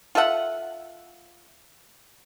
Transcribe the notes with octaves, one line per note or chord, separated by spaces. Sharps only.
F4 A4 E5 F#5